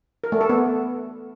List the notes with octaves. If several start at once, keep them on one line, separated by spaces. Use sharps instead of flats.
A#4
A3
A4
B3